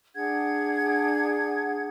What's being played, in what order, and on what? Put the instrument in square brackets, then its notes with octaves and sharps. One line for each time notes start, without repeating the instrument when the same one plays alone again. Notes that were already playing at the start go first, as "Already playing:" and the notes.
[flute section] D4 G#4 F#5 G#6